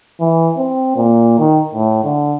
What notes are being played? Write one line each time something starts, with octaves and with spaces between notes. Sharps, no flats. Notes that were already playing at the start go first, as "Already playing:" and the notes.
E3
C4
A#2
D#3
A2
D3